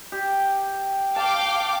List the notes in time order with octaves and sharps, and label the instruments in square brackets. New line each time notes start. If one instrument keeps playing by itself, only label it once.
[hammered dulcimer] G4
[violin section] F5 G5 D6 [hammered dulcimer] A5